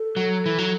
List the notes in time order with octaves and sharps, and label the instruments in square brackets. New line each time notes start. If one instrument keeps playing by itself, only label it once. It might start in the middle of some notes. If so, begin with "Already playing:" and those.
Already playing: [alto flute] A4
[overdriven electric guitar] F#3
E3
F#3